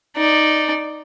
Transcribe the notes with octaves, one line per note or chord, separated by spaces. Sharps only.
D#4 D5